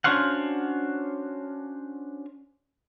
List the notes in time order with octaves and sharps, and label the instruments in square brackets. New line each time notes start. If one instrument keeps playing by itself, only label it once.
[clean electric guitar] C#4 D4 F#4 C5 F5 F#5